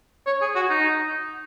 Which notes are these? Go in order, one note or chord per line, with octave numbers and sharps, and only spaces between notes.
C#5
G#4
F#4
D#4